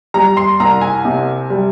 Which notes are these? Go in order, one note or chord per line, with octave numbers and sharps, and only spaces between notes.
G3 A#5
C6
C2 A#5
G#5
C3
G3